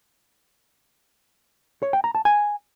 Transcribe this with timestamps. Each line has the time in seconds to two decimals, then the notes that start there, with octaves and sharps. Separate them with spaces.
1.83 C#5
1.93 G5
2.04 A#5
2.15 A5
2.25 G#5